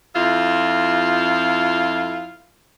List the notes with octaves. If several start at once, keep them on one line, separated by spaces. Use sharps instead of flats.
F2 E4 F4